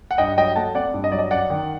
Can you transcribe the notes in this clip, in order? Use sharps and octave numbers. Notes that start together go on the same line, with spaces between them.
F#5
G2 D#5 G5
F#3 D#5 G5
A3 F#5 A5
C4 D5 F#5
G2
D#5
F#3 D5
D#5
F#2 D5 F#5
D#3